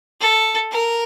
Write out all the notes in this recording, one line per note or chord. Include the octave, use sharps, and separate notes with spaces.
A4
A#4